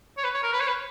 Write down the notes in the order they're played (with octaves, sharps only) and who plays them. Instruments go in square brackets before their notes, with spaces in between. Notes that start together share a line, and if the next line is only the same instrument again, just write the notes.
[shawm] C#5
B4
C#5
A#4
B4
C#5
B4